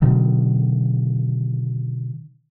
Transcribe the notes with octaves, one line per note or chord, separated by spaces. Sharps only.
B2 D3 D#3 F#3